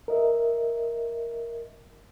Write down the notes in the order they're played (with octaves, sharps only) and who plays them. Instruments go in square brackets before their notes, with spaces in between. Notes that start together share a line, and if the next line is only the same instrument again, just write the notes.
[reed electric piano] A#4 D#5 E5